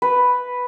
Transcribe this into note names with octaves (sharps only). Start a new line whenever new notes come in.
B4